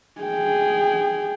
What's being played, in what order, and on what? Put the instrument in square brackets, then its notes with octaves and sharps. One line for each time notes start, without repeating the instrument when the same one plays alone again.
[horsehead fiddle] G#4 G5